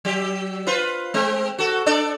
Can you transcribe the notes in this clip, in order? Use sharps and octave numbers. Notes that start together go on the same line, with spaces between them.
F#3 G4
F4 B4 C5
G#3 C4
F#4 A4
D4 A4 D5